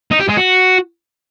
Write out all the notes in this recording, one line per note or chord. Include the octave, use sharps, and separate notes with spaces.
D#4
G4
G#3
F#4